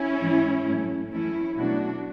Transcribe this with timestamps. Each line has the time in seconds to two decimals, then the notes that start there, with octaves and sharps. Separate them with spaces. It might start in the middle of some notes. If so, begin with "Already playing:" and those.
Already playing: C#4 E4
0.20 G#2 E3 G#3
0.66 A2 F#3 A3
1.11 F#2 E3 A3 C#4 E4
1.57 B2 F#3 A3 D4 F#4